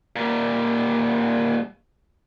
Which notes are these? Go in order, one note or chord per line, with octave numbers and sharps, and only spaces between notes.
A#2 G3